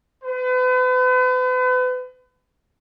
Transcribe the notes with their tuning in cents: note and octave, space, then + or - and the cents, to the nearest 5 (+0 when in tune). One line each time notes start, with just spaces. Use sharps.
B4 +40